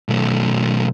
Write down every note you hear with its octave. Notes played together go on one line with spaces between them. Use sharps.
B1 A3